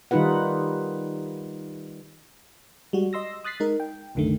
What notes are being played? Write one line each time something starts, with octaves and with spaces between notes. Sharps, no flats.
D#3 G3 D#4 F4 B4 F#5
G3 G#3 F#4
D#5 C6 E6 A#6
D#6 F#6 A6 B6 C7
G#3 D#4 A#4
G5
C2 F#2 D3 D#3 A3